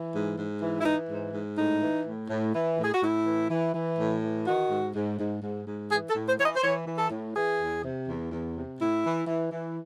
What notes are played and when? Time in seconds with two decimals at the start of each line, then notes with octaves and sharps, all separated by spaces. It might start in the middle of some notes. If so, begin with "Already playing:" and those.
Already playing: E3
0.13 G#2
0.37 G#2
0.61 E3
0.80 E4
0.85 E3 D#4
1.09 G#2
1.33 G#2
1.57 A2 D#4
1.81 E3
2.05 A2
2.29 A2
2.54 E3
2.78 A2
2.84 G#4
2.93 F#4
3.01 A2 E4
3.26 E3
3.50 E3
3.73 E3
3.98 A2
4.22 E3
4.46 D#3 F#4
4.70 G#2
4.94 G#2
5.18 G#2
5.42 G#2
5.67 G#2
5.90 E3 G#4
6.09 A4
6.15 A2
6.27 C5
6.38 E3 C#5
6.44 D#5
6.56 C5
6.62 E3 C#5
6.86 E3
6.98 A4
7.10 A2
7.35 E3 G#4
7.59 E2
7.83 C3
8.07 E2
8.31 E2
8.55 C3
8.79 A2 E4
9.04 E3
9.27 E3
9.51 E3